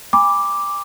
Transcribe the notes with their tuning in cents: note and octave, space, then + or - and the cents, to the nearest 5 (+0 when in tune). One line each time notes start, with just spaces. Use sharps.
G#5 -45 B5 -5 D6 +0